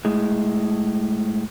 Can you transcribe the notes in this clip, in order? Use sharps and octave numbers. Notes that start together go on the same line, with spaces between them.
A2 G#3